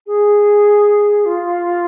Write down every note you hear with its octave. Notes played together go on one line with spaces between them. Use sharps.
G#4
F4